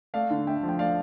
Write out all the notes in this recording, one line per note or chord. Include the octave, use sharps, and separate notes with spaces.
A3 D5 F5
D3
A3 E5 G5
F3
G5
A3 D5 F5